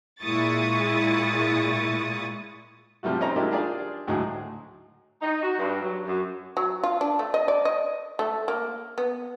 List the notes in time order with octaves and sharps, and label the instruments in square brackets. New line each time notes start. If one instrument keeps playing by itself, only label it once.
[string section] A#2 G#3 E4 C#6 D#6 A6
[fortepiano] C3 F3 G3 A3 F#4
C4 C#4 D#4 C5 A#5
F#3 G#3 A#3 D4 E4 G4
D4 F4 G4 G#4 A#4 D5
D2 A2 F#3 G#3 G#4
[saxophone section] D#4
F#4
G2
F#3
F#2
[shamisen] F#3
F4
D4
A3
D#5
D5
D#5
A3
A#3
B3